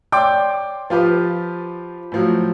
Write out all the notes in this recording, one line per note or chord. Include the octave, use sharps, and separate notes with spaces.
C#5 D5 G5 C6 D6 G6
F3 F4 G4 B4
A2 F3 F#3